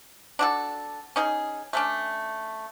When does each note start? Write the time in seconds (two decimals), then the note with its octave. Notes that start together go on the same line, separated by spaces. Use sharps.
0.39 D4 F#4 A4
1.16 C#4 D#4 G#4
1.73 A3 C#4 D4